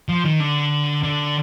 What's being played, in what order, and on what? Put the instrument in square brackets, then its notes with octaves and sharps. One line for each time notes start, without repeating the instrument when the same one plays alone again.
[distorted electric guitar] F3
D#3
D3
D3